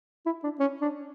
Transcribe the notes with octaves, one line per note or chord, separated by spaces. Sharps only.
E4
D4
C#4
D4